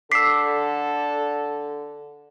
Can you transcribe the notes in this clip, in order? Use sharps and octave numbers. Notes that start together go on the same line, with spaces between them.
D3 A4 D6 E6 B6 C7